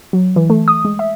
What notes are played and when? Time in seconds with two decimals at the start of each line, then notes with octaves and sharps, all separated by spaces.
0.13 F#3
0.36 E3
0.50 A3
0.68 D#6
0.85 G#3
0.99 E5